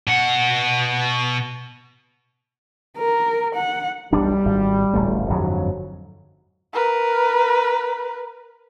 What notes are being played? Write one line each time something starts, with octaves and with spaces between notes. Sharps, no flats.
B2 F#5
A#4
F#5
E1 B1 G3 D4
G#1
D1 A1 A3
G1 F2 G#2 F#3
A#4 B4